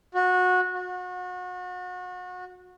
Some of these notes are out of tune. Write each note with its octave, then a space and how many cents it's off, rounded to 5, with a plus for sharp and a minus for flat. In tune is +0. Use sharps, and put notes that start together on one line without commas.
F#4 -20
F#4 -35